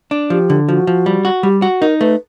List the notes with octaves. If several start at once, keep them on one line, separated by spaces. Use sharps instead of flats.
D4
F3 G4
D3
F3 F#4
F3
G3
F#4
G3 G4
F#4
D#4 A#4
A3 B4